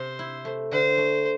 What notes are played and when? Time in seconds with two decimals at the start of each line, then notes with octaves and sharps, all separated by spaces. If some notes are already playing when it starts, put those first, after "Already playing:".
Already playing: C3 C5
0.19 E4
0.45 A3
0.71 D3 C5
0.97 A3